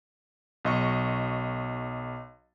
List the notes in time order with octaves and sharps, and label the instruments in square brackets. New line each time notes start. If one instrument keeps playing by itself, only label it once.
[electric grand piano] B1 D#5 C#6